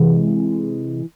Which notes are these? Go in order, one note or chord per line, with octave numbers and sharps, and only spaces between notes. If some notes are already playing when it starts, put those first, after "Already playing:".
Already playing: C3 E3 G#3